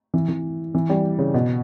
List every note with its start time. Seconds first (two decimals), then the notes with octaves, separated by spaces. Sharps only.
0.14 E3
0.29 E3
0.75 E3
0.90 G3
1.18 C#3
1.34 B2